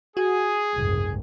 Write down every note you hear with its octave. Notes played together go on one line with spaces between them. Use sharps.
F#4 G#4
F#1 C2 G#2